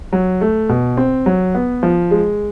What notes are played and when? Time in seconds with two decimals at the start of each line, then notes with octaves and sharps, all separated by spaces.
0.13 F#3
0.41 A3
0.69 B2
0.97 C4
1.26 F#3
1.54 B3
1.83 F3
2.11 G#3